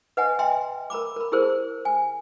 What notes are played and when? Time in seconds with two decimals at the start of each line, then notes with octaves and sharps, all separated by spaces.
0.17 B4 D#5 F#5 G#5 A#5
0.39 D#5 E5 G5 G#5 A#5 C6
0.90 A#4 A#5 B5 D6
1.16 A#4 B5
1.32 E4 G4 G#4 A#4 C5
1.85 G#5